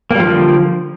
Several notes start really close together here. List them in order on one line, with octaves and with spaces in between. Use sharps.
A#3 G3 F3 D3